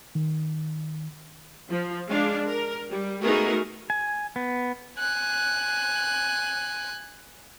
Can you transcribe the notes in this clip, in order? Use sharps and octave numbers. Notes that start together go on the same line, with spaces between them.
D#3
F3
G#3 D4 F5
A#4
G3
A3 B3 D#4 F#4 G#4 A#4
G#5
B3
G#5 F#6